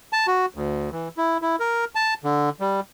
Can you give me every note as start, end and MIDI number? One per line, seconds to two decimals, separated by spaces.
0.13 0.26 81
0.27 0.46 66
0.54 0.90 38
0.92 1.08 52
1.17 1.38 64
1.42 1.56 64
1.60 1.85 70
1.95 2.14 81
2.24 2.50 50
2.60 2.80 55